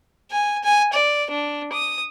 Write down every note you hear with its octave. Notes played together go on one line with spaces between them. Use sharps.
G#5
G#5
D5
D4
D#6